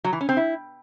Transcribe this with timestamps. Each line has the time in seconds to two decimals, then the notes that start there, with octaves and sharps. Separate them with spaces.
0.04 F#3
0.13 E3
0.21 C#4
0.29 C4
0.37 E4